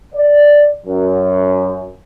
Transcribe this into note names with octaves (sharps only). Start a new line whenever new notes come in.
D5
F#2